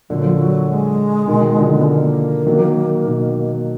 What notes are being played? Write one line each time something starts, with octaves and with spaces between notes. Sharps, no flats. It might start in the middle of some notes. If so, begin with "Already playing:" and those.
A#2 D3 F#3
F3
F#3
G#3
B2 D#3
D3 F3
B3
A#3
D#3 F#3
B2 D#3